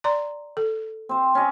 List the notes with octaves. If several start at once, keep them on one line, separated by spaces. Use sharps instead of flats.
D5 A#5 C6
A4
C4 C5
C#4 D#5